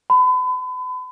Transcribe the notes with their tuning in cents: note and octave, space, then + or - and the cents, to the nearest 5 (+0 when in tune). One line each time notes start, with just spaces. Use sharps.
B5 +40